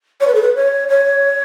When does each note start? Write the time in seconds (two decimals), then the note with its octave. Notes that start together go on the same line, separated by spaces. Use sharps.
0.20 C#5
0.27 B4
0.34 A4
0.42 B4
0.55 C#5
0.88 C#5